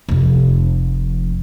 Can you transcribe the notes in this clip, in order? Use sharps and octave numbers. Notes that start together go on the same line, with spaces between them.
F1 F2